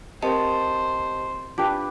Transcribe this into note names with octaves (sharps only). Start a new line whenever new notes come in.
C4 G4 A#4 C5 D#5 A5
D4 F4 G4 B4